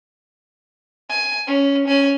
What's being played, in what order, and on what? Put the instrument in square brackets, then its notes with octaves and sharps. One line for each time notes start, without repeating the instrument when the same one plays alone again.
[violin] G#5
C#4
C#4 G#5